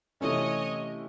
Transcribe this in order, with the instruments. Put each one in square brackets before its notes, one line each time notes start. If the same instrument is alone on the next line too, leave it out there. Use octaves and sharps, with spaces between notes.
[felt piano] C3 E3 A3 C#4 [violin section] C#5 D#5